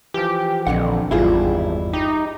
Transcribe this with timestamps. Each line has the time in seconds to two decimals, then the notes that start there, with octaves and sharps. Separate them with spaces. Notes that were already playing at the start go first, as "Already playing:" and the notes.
0.14 E3 F3 G4
0.67 A#1 F2 D3 F#5
1.11 G#1 E2 G2 G3 E4 F4 G#4
1.93 D#4 G4